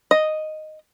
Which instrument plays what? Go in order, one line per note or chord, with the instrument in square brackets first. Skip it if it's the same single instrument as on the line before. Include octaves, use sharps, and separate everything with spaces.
[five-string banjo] D#5